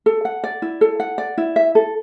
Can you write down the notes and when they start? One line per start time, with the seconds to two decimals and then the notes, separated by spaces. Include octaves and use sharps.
0.06 A4
0.25 F#5
0.44 D5
0.62 E4
0.81 A4
1.00 F#5
1.18 D5
1.38 E4
1.56 E5
1.75 A4